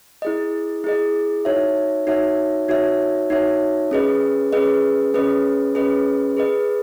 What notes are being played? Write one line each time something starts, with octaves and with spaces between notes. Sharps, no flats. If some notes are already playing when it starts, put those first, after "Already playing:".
E4 G#4 D#5
E4 G#4 D#5
D#4 F#4 C#5 E5
D#4 F#4 C#5 E5
D#4 F#4 C#5 E5
D#4 F#4 C#5 E5
C#4 G#4 B4 D#5
C#4 G#4 B4 D#5
C#4 G#4 B4 D#5
C#4 G#4 B4 D#5
G#4 B4 D#5